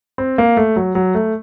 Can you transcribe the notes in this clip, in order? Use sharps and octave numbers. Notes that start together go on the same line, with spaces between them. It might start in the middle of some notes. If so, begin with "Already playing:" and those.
C4
A#3
A3
F#3
F#3
A3